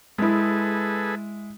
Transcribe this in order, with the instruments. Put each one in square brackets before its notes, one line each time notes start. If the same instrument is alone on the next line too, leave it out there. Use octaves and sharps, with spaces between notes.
[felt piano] G#3 E4 [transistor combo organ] G#4 A4 B4